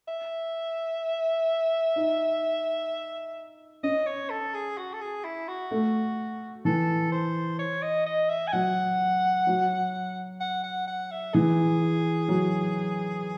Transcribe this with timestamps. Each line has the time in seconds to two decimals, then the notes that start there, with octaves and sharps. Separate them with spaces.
0.08 E5
1.96 D#4
3.83 C#4 D#5
4.06 C#5
4.30 A4
4.54 G#4
4.78 F#4
4.94 A4
5.01 G#4
5.24 E4
5.48 F#4
5.71 A3
6.65 E3 A4
7.12 C5
7.59 C#5
7.82 D#5
8.06 D#5
8.29 E5
8.48 G#5
8.53 F#3 F#5
9.47 F#3
10.40 F#5
10.64 F#5
10.88 F#5
11.11 E5
11.34 E3 G#4
12.28 F#3